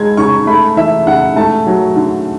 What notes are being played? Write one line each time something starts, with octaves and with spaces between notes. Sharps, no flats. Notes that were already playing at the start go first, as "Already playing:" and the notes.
Already playing: G#3 G#6
C#3 C#6
A3 B5
E3 E5
C#3 F#5
A3 A5
F#3
D3